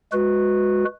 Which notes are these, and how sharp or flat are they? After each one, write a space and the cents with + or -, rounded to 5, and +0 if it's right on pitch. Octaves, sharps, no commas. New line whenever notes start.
G#3 -10 F#4 -15 B4 +0